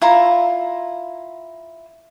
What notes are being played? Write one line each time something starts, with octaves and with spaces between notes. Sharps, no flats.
E4 F4 A#5